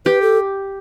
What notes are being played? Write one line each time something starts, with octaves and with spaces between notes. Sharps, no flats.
G4 B4
A4